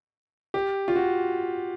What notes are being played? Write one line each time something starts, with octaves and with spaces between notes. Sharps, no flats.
G4
F4
F#4